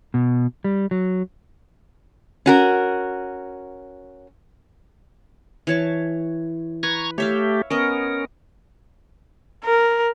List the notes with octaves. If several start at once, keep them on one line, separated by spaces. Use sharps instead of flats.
B2
G3
F#3
C#4 F#4 A#4
E3 C#5 A5
B4 A#5 C#6 G#6
A3 G4 C#5 E5 F5
B3 C#4 A#4 D#5
A#4